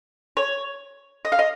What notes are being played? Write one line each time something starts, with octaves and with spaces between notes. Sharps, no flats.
C#5
D#5
F5
D#5